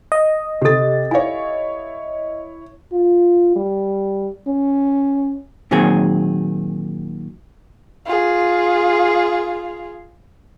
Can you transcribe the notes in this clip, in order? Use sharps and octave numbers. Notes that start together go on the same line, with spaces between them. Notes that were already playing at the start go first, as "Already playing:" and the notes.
D#5
C3 G4 A4 A6
E4 C#5 F5 G#5
F4
G3
C#4
A#2 D#3 F#3 C4 G#4
F4 G#4